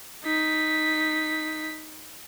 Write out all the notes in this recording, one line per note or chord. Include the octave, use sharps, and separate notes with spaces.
D#4 B6